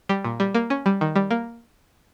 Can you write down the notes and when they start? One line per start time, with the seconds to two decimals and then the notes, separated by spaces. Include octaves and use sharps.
0.09 G3
0.24 A#2
0.40 G3
0.55 A#3
0.70 C#4
0.86 G3
1.01 D#3
1.16 G3
1.31 A#3